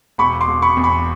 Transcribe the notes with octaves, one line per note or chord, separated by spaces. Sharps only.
E1 B5 C#6
C6 D6
E1
B5 C#6
E2
B5 C#6